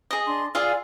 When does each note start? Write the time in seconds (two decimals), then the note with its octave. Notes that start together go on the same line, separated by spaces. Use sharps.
0.11 G#4 D#5
0.27 D4 C6
0.55 F4 G#4 D5 F5 G#5 E6